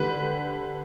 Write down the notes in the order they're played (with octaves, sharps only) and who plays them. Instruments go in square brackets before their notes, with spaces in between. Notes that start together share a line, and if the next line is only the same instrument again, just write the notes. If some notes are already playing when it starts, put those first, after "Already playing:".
Already playing: [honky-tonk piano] D3 G4 B4